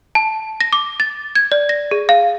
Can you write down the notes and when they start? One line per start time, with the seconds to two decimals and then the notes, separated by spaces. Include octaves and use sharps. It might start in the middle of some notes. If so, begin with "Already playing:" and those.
0.15 A5
0.60 A#6
0.73 D6
1.00 A6
1.35 G#6
1.52 D5
1.69 A#6
1.91 G#4
2.09 F5